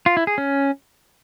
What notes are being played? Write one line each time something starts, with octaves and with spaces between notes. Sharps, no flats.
F4
E4
G#4
C#4